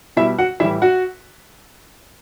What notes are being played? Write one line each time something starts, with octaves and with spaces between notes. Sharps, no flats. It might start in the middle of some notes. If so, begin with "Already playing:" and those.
B2 G3 E4 E5
F#4 F#5
A2 E3 G3 E4 E5
F#4 F#5